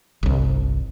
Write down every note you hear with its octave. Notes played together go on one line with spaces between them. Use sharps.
G1 C2